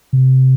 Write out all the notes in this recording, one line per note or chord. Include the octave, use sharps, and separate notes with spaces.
C3